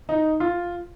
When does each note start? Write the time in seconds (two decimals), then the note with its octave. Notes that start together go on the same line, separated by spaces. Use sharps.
0.09 D#4
0.40 F4